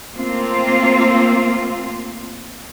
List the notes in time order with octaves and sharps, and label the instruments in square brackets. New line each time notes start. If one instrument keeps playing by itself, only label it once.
[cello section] A3 A#3 C4 F4